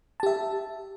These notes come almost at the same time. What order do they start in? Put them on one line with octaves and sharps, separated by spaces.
A5 G4 E5